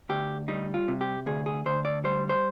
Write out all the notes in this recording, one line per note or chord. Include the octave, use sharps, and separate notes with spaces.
D2 G4
G3 D#4
F4
C3
G4
D2 G#4
G#4
D2 C5
D5
G3 C5
C5